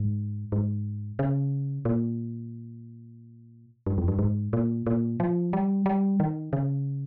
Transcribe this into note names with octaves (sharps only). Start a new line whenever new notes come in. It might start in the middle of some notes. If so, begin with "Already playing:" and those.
Already playing: G#2
G#2
C#3
A#2
G2
F2
G2
G#2
A#2
A#2
F3
G3
G3
D#3
C#3